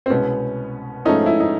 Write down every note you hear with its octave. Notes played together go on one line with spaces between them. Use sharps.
C4
C2 B2 G#3 B3 C#4
G#2 F3 A3 C#4 D#4
E4
D#4